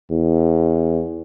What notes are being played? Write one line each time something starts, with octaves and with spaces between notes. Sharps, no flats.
E2